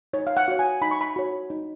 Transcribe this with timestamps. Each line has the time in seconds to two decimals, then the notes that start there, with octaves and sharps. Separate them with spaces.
0.13 D#4 C#5
0.27 F5
0.37 F#5
0.48 F#4 C#5
0.59 G#5
0.82 D#4 B5
0.91 C#6
1.01 B5
1.16 F#4 C#5
1.50 D#4